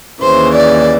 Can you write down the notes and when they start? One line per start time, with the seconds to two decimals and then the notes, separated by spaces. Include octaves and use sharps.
0.22 D#2 C#3 E3 C5
0.55 D5